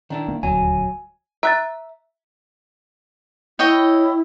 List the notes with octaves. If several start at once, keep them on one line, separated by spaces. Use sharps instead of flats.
D#3 D4 E4
A#3
D#1 D2 F#3 G#5
E5 A#5 F#6 A6
E4 C#5 D#5 G5